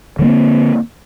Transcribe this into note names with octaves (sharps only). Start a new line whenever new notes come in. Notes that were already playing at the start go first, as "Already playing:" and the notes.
D3 G3 A#3 C4